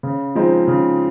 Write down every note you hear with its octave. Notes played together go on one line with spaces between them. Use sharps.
C#3
F3 G#3 C4 D#4
C#3